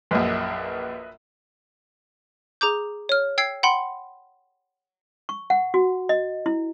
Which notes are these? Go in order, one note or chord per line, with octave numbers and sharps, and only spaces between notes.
A#1 F#2 B4 D#5 E5
G#4 A#5 D6 G6
C#5 F6
G5 E6 G#6 C7
F#5 G5 B5 C6
C#6
F#5
F#4
D#5
E4